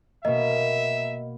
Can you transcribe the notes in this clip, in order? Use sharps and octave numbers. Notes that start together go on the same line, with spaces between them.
B2 A#3 D#5 E5